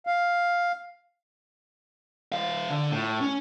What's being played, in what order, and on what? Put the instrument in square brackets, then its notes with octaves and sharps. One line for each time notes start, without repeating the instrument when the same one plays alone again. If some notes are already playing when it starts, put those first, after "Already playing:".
[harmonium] F5
[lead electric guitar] E3 F5
D3
A2
C#4